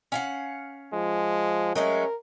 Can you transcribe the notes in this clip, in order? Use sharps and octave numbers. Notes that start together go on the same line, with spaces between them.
C#4 F5 F#5
F3 G#3
F#3 G#3 A3 C#4 A#4